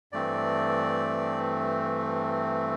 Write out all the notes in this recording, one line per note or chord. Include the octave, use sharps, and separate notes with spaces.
G2 E3 A3 C4 D5